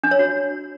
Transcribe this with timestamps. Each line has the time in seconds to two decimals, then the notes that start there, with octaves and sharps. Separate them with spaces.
0.03 D4
0.11 C#5
0.19 F#4